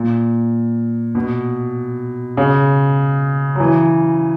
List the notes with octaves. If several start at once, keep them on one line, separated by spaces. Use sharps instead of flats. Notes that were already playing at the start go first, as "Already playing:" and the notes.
Already playing: A#2
B2
C#3
F#3
E3